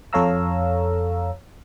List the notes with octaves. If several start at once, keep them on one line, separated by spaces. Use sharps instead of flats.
F2 A4 C#5 F5 A#5 E6